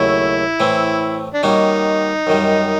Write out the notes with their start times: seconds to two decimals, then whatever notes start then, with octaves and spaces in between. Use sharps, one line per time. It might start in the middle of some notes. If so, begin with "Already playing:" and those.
Already playing: D#2 C#3 F#3 A3 E4
0.60 A2 E3 A3 C4
1.34 D4
1.43 D#3 G3 A#3 C#4 D#4 F#4
2.27 F#2 D#3 G3